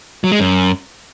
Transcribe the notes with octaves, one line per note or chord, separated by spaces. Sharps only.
F#3
G#3
F#2